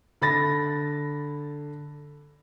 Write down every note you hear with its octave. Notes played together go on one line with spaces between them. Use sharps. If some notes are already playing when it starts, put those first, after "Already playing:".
D3 B5 A6 A#6